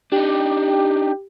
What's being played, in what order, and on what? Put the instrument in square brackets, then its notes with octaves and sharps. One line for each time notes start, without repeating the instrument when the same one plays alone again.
[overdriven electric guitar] D4 D#4 [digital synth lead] G4